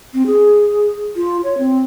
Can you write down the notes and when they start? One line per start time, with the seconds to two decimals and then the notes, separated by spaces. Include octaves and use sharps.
0.14 C4
0.26 G#4
1.16 F4
1.44 C#5
1.58 C4